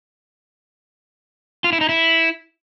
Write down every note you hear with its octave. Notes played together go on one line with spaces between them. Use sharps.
F4
E4
D#4
E4